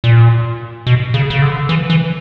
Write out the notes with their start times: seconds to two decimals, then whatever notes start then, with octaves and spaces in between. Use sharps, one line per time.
0.04 A#2
0.87 B2
1.14 C#3
1.30 C#3
1.42 D3
1.69 E3
1.90 E3